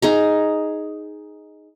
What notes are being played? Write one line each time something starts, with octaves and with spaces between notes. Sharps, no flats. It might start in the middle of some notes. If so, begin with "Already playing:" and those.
D#4 G#4 A#5